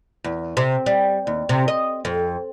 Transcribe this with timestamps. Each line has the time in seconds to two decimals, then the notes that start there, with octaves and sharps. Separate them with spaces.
0.24 E2
0.57 C3
0.86 G3
1.27 D#2
1.49 C3
1.68 D#5
2.05 F2